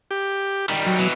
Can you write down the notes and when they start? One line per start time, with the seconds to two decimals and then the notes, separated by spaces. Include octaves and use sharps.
0.11 G4
0.70 D#3 G3
0.86 F#3
0.99 B2 E3